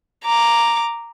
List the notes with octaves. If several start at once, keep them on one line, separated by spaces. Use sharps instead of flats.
A#5 D6